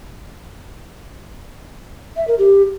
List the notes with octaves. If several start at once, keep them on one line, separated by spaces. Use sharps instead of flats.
E5
A#4
G4